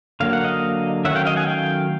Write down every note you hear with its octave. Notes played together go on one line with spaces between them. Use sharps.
D3 F#3 A#3 F5
F#5
D#5 F5
D#3 F#3 A3 C#4 E5 F#5
F5 G5
D#5 F5
F#5 G#5
F5 G5